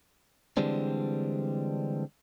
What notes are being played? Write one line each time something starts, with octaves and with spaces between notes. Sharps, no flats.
D3 E3 G3 G#3 C4 D4